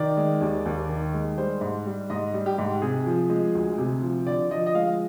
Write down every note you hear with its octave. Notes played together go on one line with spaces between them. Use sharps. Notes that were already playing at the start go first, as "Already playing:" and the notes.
Already playing: D#3 D5
G#3
D#2
D#2
D#3
G#3
G3 C5
G#2
G3
G#2 D#5
G3
G4
G#2
C3 G#4
F3
G#3
D2
C3
F3
D3 D5
F3 D#5
D#5
G#3 F5